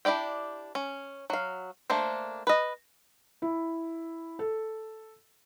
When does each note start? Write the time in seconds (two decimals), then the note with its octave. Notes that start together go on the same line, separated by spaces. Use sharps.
0.05 D4 E4 G4 D5 G5
0.75 C#4
1.30 F#3 F5
1.90 A3 A#3 D4 C5
2.47 B4 D#5
3.42 E4
4.39 A4